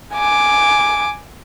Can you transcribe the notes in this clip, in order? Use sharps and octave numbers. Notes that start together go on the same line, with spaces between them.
G#5 D6